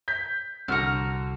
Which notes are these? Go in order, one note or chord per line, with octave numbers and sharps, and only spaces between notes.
G6 B6
C2 D3 F#4 A#5 F6 C#7